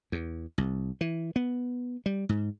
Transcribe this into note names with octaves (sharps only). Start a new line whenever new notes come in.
E2
C2
E3
B3
G3
G#2